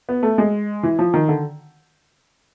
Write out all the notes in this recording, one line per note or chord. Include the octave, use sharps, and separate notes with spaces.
B3
A3
G#3
E3
F3
D#3
D3